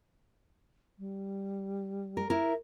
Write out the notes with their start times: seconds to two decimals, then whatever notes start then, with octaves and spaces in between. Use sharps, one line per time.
0.99 G3
2.17 A#4
2.30 E4 A#4 E5